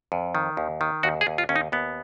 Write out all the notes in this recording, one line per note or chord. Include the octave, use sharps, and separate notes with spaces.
F2
D#3
D#2
D#3
D#2 F#4
G#4
D#2
F4
D#2 C#4
D#4
D#2 B3